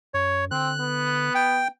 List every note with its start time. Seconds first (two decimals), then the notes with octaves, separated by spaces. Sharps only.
0.14 F#2 C#5
0.51 D3 C4 F#6
0.80 B3
1.35 G5